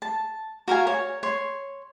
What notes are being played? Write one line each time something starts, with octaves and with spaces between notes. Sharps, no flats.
A5
F#4 A#4 F5 G#5
C#5
C#5 C6